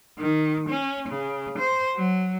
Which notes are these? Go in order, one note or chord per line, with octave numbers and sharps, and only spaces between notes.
D#3
C#4
C#3
C5
F#3